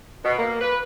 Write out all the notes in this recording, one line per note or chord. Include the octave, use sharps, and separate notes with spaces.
B2
A#3
B4